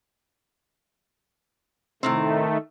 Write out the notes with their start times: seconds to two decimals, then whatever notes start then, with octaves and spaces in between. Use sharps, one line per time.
2.03 A2 C3 D#3 A3 C4